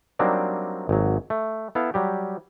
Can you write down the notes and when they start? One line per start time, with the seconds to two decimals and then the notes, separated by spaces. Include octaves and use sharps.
0.19 F#3 G3 A#3 C4 D4 D#4
0.89 G#1 F#3
1.30 A3
1.75 B3 E4 A4 F5
1.94 F#3 G3 G4